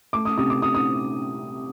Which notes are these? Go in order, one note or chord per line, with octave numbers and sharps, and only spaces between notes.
A3 D6
D#6
C3 D#6
D6
C3 D#6
D#6